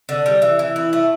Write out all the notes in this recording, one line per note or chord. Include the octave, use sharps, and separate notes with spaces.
D3
G3
E3
E3
E4
A3